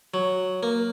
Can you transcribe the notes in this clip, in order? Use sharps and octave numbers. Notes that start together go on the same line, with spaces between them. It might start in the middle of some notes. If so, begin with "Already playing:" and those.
F#3
A#3